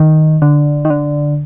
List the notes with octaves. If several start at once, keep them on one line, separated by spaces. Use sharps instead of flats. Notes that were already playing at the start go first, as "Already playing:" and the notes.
Already playing: D#3
D3
D#3
D3